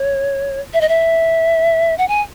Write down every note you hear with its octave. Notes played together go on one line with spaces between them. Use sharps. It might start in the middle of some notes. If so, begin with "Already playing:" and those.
Already playing: C#5
E5
D#5
E5
F#5
G#5